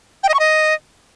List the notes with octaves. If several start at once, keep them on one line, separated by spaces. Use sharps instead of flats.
G5
D#5
C#6
D#5